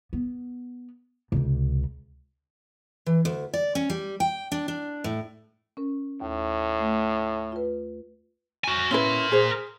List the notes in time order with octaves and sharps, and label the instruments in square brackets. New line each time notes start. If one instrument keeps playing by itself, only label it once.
[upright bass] B3
C#2 C3
[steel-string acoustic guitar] E3
D2
D5
C#4
G3
G5
D4
D4
A2
[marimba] C#4 A#4
[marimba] D#2 [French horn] A2
[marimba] A3
F4 B4
[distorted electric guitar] F#4 G#5
[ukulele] C#4 E4 B4 [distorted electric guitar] A#4 C6
[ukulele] G#4 C5